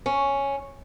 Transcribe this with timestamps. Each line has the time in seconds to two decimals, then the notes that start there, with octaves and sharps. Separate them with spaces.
0.06 C#4